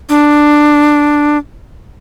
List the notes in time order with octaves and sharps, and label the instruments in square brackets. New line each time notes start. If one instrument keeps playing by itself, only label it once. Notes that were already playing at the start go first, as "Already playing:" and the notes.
[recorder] D4